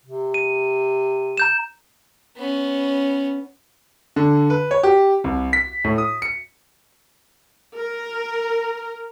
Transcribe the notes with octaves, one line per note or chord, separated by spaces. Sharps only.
C3
D#7
A#5 G6 E7
B3 C#4
D3
B4
C#5
G4
C2
B6
A2
D#6
C#7
A#4